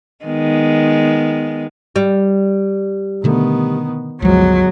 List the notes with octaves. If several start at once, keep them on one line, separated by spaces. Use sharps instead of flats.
D#3 G#3 B3
G3
B2 D3 D#3 A3 B3
G1 C#2 F3 F#3 G#3